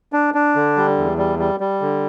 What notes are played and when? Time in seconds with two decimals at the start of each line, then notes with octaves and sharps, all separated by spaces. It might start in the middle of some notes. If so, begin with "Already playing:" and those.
0.13 D4
0.34 D4
0.55 D3
0.77 G3
0.98 E2
1.18 G3
1.39 G3
1.60 G3
1.81 D3